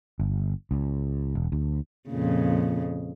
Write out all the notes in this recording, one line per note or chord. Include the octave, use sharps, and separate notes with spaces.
G1
C#2
E1
D2
F2 A#2 C#3